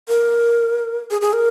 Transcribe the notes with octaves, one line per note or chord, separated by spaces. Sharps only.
A#4
G#4
G#4
A#4